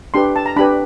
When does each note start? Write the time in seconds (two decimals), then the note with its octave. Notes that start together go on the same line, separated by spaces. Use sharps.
0.14 D4 G4 B4 C6
0.36 A5
0.46 A#5
0.56 D4 G4 B4 B5